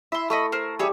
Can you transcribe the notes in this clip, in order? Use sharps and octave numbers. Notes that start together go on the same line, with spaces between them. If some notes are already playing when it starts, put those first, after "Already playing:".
E4 E5 C6
A3 D#5 B5 C#6
A#4 C5
G3 G4 G#4 C#5 E5